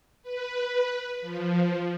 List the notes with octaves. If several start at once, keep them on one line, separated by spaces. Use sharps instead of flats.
B4
F3